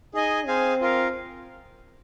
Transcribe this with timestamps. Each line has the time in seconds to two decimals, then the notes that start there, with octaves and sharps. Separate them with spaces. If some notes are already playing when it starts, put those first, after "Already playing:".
0.14 D#4 G#4 D#5 G#5
0.47 C4 G#4 C5 F5 G#5
0.81 F4 A#4 F5